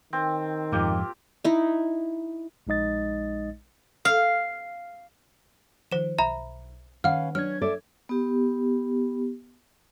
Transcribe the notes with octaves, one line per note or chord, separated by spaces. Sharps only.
D#3 C4
F2 G#2 A#3 F4 G4
D#4 E4
A#1 G#3 D#4 D#5 A6
F5
D#3 F3 C5 E7
B1 E5 A#5 B5
D#3 C#4 B4 F5 F#5 F6
F#3 C#4 D4 F6 G#6
A4 D5 E5
B3 G4